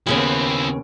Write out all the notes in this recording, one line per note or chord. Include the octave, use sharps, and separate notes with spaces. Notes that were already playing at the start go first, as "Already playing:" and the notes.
D#2 C#3 B3 C4 E4